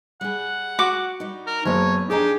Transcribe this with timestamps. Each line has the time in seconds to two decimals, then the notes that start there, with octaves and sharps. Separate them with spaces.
0.21 G3 G#4 F#5
0.79 F#4 D6
1.20 G3 D#4
1.47 A#4
1.65 F#1 B3 D#4 C#5
2.10 F2 D4 D#4 G4 G#4 A#5